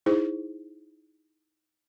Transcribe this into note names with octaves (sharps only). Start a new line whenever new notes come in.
D#4 E4 G#4 C5